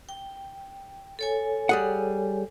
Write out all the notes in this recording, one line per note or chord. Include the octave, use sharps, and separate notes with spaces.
G5
A4 C#5 G#5
G3 G#4 F#5